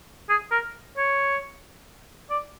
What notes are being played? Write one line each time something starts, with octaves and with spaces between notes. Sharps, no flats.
G#4
A#4
C#5
D5